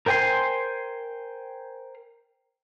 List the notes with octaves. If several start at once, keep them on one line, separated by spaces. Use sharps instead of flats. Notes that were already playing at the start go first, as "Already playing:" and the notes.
A#4 C5 G5 G#5 C6